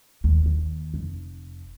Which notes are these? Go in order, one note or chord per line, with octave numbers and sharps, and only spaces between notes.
D#2
D#2
F1